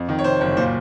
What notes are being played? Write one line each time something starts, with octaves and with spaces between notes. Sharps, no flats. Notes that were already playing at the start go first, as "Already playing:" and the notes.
Already playing: F2
D#3
C#5
C3 C5
F#1 C#5
A#2 C5